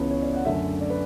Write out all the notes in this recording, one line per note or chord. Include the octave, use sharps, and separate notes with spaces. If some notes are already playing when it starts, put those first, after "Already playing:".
Already playing: C#2 C#3 E3 B3 C#5
C#5
D5
F#5
F#2 D3 A3 E5
D5
B4